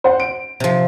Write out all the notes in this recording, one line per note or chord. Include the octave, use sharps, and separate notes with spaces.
C5 F#5
D7
C3 F3